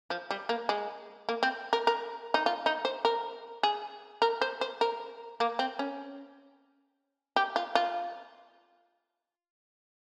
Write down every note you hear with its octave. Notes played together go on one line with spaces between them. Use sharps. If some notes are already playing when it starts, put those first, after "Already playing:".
F3
G3
A#3
G#3
A#3
C4
A#4
A#4
D#4
F4
D#4
C5
A#4
G#4
A#4
C5
C5
A#4
A#3
C4
C#4
G4
F4
F4